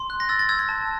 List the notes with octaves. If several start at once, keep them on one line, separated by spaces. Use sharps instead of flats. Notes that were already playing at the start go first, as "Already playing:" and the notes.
Already playing: C6
F#6
A#6
E6 A6
A6
E6 G#6
G#6
A5